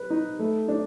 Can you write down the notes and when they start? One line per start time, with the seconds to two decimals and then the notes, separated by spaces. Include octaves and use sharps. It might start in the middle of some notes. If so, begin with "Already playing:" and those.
Already playing: B4
0.10 D#4
0.39 A3
0.68 D4